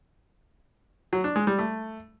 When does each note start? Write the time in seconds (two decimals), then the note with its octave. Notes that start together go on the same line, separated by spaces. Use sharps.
1.13 F#3
1.24 D4
1.36 G#3
1.47 G3
1.59 A3